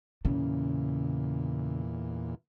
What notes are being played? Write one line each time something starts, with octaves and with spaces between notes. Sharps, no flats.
E2 A#2 C#3